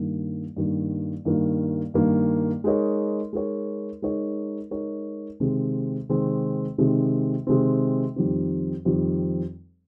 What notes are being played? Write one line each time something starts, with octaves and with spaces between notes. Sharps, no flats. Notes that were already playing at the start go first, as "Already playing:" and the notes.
Already playing: G2 D#3 A#3
G2 D#3 A#3
G2 D#3 A#3
G2 D#3 A#3
G#3 D#4 A#4 C#5
G#3 D#4 A#4 C#5
G#3 D#4 A#4 C#5
G#3 D#4 A#4 C#5
C3 D#3 G#3 C4
C3 D#3 G#3 C4
C3 D#3 G#3 C4
C3 D#3 G#3 C4
F2 D#3 G3 C4
F2 D#3 G3 C4